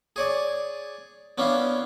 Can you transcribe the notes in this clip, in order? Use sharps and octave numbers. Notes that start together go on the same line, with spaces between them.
G#4 C#5 D5
B3 C#4 D4 E4 F5